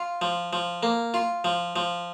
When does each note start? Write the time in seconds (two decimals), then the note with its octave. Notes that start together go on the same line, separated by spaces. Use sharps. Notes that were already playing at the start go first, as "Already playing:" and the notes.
Already playing: F4
0.22 F3
0.53 F3
0.83 A#3
1.14 F4
1.44 F3
1.76 F3